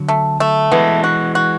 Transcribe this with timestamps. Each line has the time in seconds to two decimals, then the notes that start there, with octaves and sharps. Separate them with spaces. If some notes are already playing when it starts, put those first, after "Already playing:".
Already playing: D3 F#3
0.08 A3
0.40 A3
0.72 E3 G#3 B3
1.04 F#4
1.35 F#4